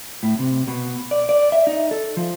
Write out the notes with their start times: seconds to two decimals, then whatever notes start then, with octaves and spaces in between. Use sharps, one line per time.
0.23 A2
0.39 C3
0.68 B2
1.11 D5
1.29 D5
1.52 E5
1.67 D#4
1.91 A4
2.17 F3